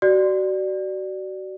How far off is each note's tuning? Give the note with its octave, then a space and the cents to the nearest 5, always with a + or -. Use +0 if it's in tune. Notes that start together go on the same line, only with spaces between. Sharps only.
F#4 +30 D5 +10